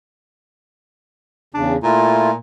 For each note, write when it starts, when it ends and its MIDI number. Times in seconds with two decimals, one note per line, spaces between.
1.54 1.77 40
1.54 1.77 49
1.54 1.74 62
1.83 2.34 46
1.83 2.31 57
1.83 2.31 64
1.83 2.31 65